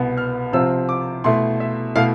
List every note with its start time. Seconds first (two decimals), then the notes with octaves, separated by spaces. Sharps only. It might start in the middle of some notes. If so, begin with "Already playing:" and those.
Already playing: C2 B2 B3
0.18 F6
0.53 C3 F3 C4 F4 E6
0.89 D6
1.24 B2 A3 E4 C6
1.60 E5
1.95 B2 A3 E4 F5